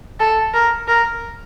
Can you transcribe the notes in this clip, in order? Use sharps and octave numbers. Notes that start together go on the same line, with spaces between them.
A4
A#4
A#4